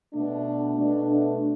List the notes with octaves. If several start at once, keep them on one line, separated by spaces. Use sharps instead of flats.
B2 A3 D4
B2 A3 D4
D4